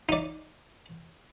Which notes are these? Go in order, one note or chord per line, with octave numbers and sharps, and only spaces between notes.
D#4 D5